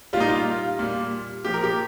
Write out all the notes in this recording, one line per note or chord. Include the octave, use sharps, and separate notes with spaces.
A#2 G3 D#4 F4
F4
A#2 G3
A#2 F3 G4
A#4
G4